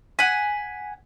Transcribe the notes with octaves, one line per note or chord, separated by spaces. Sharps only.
F#5 G#5 B6